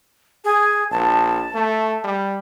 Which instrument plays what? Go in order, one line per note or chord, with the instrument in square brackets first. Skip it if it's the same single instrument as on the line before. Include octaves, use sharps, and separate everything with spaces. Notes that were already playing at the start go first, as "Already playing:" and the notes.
[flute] G#4
[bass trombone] A#1 [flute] A5
[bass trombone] A3
G3